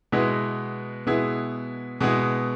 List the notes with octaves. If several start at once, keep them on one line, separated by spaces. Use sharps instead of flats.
B2 G#3 B3 E4 G#4
B2 G#3 B3 E4 G#4
B2 G#3 B3 E4 G#4